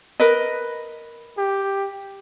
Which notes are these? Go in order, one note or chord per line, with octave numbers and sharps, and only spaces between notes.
A#4 B4 D#5
G4